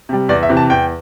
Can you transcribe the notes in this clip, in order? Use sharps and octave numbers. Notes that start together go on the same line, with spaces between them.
C3 G3
E2 D5
E5
C3 E3
A5
E2 G5